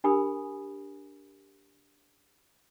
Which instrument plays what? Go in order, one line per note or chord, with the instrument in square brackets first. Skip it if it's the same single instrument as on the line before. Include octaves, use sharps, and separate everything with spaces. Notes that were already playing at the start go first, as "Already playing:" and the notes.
[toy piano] D4 G4 A#4 G#5 B5 D#6